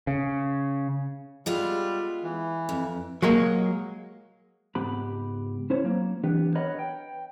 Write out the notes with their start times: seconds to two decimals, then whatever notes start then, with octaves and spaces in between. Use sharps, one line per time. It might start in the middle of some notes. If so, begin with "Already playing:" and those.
0.07 C#3
1.46 G3 G#3 B3 F4
2.23 E3
2.69 F2
3.22 F#3 G#3 A#3
4.75 C#2 G#2 B3 G4 B5
5.70 C#4 E4 C5 C#5
5.84 F#3 A#3
6.24 E3 B3 D4 G4
6.55 A#4 B4 C#5 D#5 F#5 B5
6.79 G5